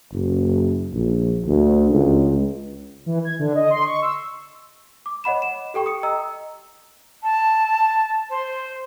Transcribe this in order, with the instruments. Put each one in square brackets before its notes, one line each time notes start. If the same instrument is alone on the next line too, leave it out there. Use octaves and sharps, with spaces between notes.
[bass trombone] F#1
A#1
D2
C#2
[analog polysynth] E3
G#6
D3
D#5
C6
C#6
E6
[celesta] D6
C#5 D#5 F#5 B5 E7
E7
G4 A4 G5 C#6
D#6 C#7
D#5 A#5 E6
[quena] A5
C5